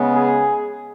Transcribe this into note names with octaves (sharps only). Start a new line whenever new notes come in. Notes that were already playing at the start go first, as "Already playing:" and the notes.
Already playing: C#3 G#3 B3
G#4